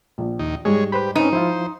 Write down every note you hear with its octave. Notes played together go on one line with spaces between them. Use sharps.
A#1
D#2 D#4
G#2 G3 G#3 G#4 C#5
G4 B4 C5 B5
C4 C#4 D#4 B4
F3 E4 F4 C5